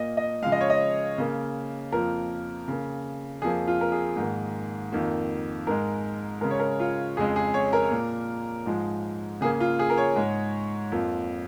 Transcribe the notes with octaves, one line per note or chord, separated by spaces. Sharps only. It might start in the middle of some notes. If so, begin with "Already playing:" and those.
Already playing: A#2 A#3 D#5
D#5
C#3 F3 G#3 F5
D#5
C#5
D#5
C#3 A#3
F2 F3 A#3 A#4
C#3 A#3
F2 F3 A#3 G#4
F4
A#4
G#4
G#2 D#3 A#3
F2 D#3 A#3
G#2 G#3 A#4
C#3 G#3 A#4
C#5
A#4
F4
F2 C#3 G#3 G#4
G#4
C#5
A#4
A#2 A#3
G#2 F3 G#3
C#3 A#3 G#4
F4
G#4
A#4
C#5
G#2 G#3
F2 F3 A#3